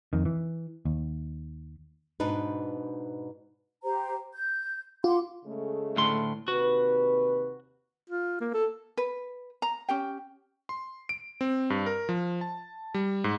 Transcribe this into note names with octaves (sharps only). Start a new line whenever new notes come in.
F2 D#3
E3
D#2
G#2 B2 D4 D#4 B4
G4 C5 A#5
G6
F4 F#5 C6 D6
C#3 G#3 A3
D2 A2 C6
D#2 C3 F#4 B4
F4
A#3
A4
B4
A#5
C#4 G4 G5
C6
D7
C4
G2
A#4
F3
A5
G3
G#2